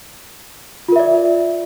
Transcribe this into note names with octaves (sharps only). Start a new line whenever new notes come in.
F4 A#4 D5 E5